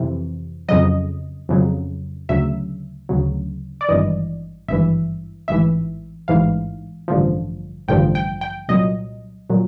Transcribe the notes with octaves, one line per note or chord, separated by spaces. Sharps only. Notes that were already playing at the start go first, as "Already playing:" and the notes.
Already playing: F2 C3 E3
F2 C#3 F#3 D#5
F2 C#3 F#3
D2 C#3 F#3 E5
D2 C#3 F#3
D5
G#1 G2 E3 D#5
G#1 G2 E3 E5
A1 G#2 E3 E5
A1 G#2 E3 F5
A1 G2 D3 F3
A1 G2 D3 F3 G5
G5
G5
C2 A#2 F#3 D#5
A#2 F#3